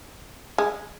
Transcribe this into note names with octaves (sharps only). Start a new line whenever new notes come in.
G#3